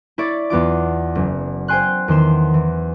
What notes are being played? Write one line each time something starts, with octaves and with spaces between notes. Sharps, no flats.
E4 C#5 D5 A6
E2 B3 F4 D6
F#1
C5 G5 G#5 C6 F#6
E2 D#3 C6 E7
E3